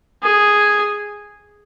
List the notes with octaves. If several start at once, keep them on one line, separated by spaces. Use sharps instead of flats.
G#4